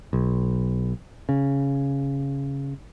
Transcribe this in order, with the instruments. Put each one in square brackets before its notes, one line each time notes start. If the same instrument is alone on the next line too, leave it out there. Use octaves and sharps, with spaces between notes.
[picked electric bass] B1
C#3